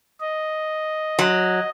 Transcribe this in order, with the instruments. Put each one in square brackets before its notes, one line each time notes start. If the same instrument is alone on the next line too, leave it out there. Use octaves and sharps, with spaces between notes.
[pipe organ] D#5
[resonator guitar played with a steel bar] F#3